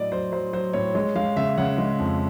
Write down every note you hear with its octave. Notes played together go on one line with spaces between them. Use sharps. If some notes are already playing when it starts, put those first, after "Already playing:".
Already playing: A2 F#3 D5 D#5
F#3 C5
F#3 C5
F#3 C5
A2 C#5
G#3 C#5
G#3 F5
C#3 E5
C#3 F#5
G#3
F2